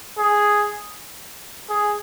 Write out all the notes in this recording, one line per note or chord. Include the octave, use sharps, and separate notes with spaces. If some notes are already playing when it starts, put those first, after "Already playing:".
G#4
G#4